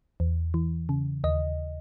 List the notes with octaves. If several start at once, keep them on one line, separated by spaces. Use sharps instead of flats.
E2
E3
C#3
D#2 D#5